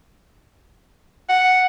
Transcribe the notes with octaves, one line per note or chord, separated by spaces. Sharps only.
F#5